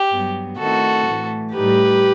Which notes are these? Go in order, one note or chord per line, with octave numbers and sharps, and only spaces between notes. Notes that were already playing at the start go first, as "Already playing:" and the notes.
Already playing: G4
G2 F#3 B3
D#3 A3 C4 E4 F#4 A4
A2 E3 A3
A2 G3 D#4 G4 B4